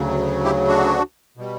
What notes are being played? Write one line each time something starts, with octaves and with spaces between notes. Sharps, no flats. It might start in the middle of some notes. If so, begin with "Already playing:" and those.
Already playing: D2 C#3 F#3
E4 G4
D4 F#4
B2 G3